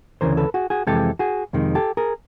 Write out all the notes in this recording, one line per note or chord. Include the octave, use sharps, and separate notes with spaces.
D2 C#3 E3 A#4 C5
A4 B4
F#4 G#4
F#4 G#4
F2 C3 E3 G#3 G4 A4
F#4 G#4
F2 C3 D#3 G#3
G4 A4
G#4 A#4